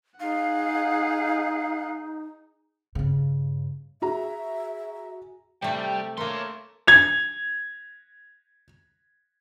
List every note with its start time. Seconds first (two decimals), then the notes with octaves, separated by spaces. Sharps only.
0.20 D#4 G#4 F5 F#5
2.95 G2 C#3
4.02 F#4 G#4 E5 A#5
5.62 C3 G3 A3 G5
6.17 A3 A#3 A#4 C#5 C6
6.88 G#6 F7